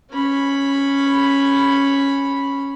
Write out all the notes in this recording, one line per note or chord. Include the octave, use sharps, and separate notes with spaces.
C#4 B5